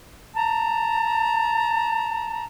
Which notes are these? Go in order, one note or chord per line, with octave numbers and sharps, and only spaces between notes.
A5 A#5